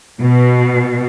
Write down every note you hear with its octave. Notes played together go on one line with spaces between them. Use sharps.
B2